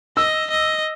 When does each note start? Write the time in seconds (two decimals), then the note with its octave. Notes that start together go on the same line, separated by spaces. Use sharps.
0.17 D#5 E6
0.51 D#5